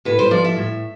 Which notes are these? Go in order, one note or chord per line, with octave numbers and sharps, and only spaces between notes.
A2 B4
C5
F3 D5
E5
A2